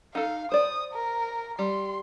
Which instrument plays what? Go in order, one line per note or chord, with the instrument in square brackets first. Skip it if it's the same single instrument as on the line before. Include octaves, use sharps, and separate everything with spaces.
[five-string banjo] D#4 A4 [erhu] F5
[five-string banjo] C5 D5 [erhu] D#6
[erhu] A#4
[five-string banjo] G3 [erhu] C6